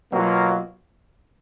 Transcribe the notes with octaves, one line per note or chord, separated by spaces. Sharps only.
B2 F#3 A#3 F4